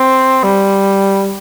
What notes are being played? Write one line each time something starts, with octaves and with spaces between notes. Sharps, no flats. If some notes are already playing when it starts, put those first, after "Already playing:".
Already playing: C4
G3